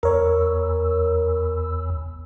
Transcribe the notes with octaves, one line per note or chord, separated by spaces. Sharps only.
E2 A#4 C#5